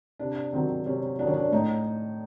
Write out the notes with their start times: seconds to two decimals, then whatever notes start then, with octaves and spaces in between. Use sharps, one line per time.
0.19 C3 D4
0.52 D#3 F#3 C4
0.86 C3 C#4
1.19 F#3 D4
1.23 D#3 C#4
1.34 D4
1.52 A2 D#4